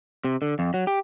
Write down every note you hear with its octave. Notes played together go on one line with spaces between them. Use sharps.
C3
D3
F2
F#3
G4